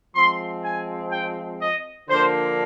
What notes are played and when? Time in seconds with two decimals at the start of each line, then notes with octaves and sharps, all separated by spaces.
0.15 F3 G#3 C4 C6
0.65 G#5
1.12 G5
1.61 D#5
2.09 D3 F3 A#3 D4 C5